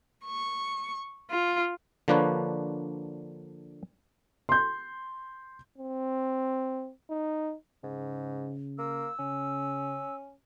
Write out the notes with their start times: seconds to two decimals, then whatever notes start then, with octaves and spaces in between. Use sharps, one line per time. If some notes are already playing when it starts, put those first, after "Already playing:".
0.25 C#6
1.30 F4
2.08 D3 F3 A#3 D4 B4 C#5
4.49 C6 G6
5.78 C4
7.10 D#4
7.84 G#2 C#3
8.78 A#3 E6
9.19 C#3 C#4